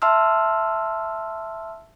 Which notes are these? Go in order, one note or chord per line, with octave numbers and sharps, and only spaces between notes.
E5 A5 C6 E6 F6